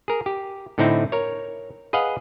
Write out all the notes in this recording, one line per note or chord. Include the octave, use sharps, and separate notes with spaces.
G#4 A#4
G4
A2 D3 C4 D#4 E4
A#4 C#5
G#4 B4 D#5 F5 F#5